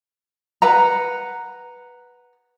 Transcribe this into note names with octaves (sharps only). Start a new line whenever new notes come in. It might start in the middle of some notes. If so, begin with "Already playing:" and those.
B4 F#5 A#5